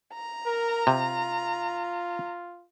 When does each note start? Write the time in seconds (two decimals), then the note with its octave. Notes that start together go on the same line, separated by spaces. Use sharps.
0.13 A#5
0.46 A#4
0.87 C3 F4